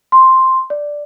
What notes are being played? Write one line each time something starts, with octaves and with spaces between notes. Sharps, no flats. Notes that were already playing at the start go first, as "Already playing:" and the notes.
C6
D5